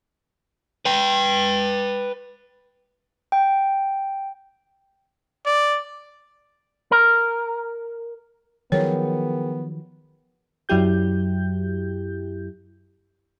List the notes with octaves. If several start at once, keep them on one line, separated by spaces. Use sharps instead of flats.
B4 G5
G5
D5
A#4
D#3 F3 F#3 B3 G#4 A#4 C#5 G5
F#2 F#3 E4 G4 G6